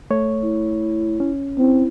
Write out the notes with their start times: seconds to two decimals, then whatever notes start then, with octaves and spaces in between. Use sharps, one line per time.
0.10 A3 C#5
0.41 E4
1.20 C#4
1.58 C4 E4